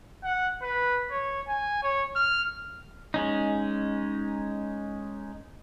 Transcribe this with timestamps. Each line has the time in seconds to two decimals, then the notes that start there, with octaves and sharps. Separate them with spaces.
0.24 F#5
0.63 B4
1.11 C#5
1.48 G#5
1.83 C#5
2.16 F6
3.14 G#3 C#4 D#4